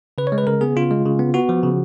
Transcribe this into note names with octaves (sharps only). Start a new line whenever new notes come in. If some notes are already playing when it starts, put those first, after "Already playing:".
C#3 B4
C#5
G#3
B4
C#3 A#4
B3 G#4
C#3 F4
G#3
C#3
B3
B3 F#4
F3
C#3